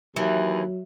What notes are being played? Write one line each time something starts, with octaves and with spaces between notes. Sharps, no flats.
D#2 E3 F#3